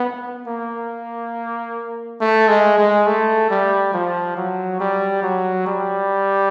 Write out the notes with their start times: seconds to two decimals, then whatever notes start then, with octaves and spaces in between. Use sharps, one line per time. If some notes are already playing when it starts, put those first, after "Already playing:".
Already playing: B3
0.47 A#3
2.20 A3
2.48 G#3
2.78 G#3
3.06 A3
3.50 G3
3.93 F3
4.37 F#3
4.80 G3
5.23 F#3
5.67 G3